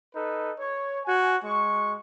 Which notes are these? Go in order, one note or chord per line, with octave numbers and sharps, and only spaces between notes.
D#4 A4 B4
C#5
F#4 G#5
G#3 C#6